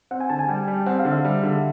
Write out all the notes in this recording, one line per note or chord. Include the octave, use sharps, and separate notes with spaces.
C4 F#5
G#5
D3 A5
G#5
G3 G5
G3
C4 F#5
F5
D3
E5
G3
D3